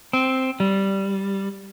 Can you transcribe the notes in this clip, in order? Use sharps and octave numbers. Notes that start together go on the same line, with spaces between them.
C4
G3